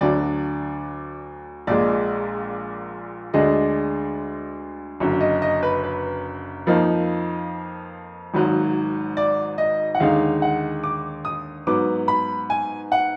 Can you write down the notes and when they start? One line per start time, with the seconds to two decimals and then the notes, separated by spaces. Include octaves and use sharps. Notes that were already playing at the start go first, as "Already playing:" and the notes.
0.01 D2 D3 F#3 D4 D5
1.67 A#1 A#2 G#3 D5
3.34 D2 D3 G#3 D4 D#5
5.00 F#1 F#2 D3
5.21 D#5
5.42 D#5
5.63 B4
5.84 B4
6.67 F2 F3 A#3 D#4
8.34 G#1 G#2 D#3 F#3
9.17 D5
9.58 D#5
9.95 F#5
10.00 D#2 D3 G#3 D#4 F5
10.42 F#5
10.84 D6
11.25 D#6
11.67 G#2 F#3 B3 D6
12.08 B5
12.50 G#5
12.92 F#5